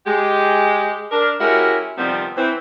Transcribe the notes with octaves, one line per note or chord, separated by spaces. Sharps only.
G#3 G4
D4 A#4
G#3 C#4 E4 F#4 G4 A#4
C3 D#3 F3 G3 B3 C4
E3 C4